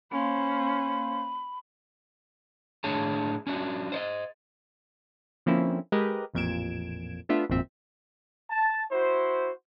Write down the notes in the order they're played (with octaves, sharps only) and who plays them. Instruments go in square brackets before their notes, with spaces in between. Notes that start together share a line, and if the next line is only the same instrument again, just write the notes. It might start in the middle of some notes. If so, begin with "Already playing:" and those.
[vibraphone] A#3 F5 C6 [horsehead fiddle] C#4 C5 [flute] B5
[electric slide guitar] A2 D4 G#4 C#5 A5
C#4 D4 F#4
C5 C#5 D#5
[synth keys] D3 F3 A#3 C4 C#4 E4
G#3 G4 A#4 B4 D#5
A1 F2 A#2 G#6 D7 E7
A3 B3 D4 F4 E5
G#1 F2 A#2 C4 E5
[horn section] A5
E4 F#4 C5